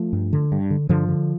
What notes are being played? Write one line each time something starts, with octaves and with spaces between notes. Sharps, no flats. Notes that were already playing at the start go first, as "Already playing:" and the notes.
Already playing: F3 A3
G2
D3
G2
D3
G2 D3 F3
D3